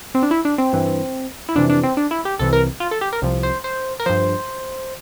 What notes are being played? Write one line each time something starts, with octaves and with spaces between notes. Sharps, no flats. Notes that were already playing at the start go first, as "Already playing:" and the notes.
C4
D4
E4
D4
C4
G2 E3
E4
F2 C3 E3 D4
D4
C4
D4
E4
G4
C2 C3 E3 A4
A#4
F4
A4
G4
A#4
C2 C3 F3
C5
C5
A#4
G2 F3 C5